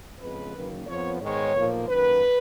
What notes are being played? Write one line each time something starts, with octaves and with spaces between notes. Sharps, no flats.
F2 C#3 G#3 B3 B4
F#1 F#2 D#3 A#3
F2 F3 B3 C#5
G#2 D#3 G#3 B3 C#5
B1 A#2 F3 A#3
F#2 D#3 A#3 B4